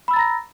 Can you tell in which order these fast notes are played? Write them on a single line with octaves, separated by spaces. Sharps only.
B5 E6 A6 A#5 A#6